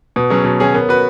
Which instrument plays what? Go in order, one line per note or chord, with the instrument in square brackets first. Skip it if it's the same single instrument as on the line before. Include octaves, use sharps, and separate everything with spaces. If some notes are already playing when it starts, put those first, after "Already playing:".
[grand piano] B2 [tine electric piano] B4
[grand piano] F#3 C#4 G#4
B2
F#3 C#4 G#4
[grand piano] B3 [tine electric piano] A#4 C#5
[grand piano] F#4 B4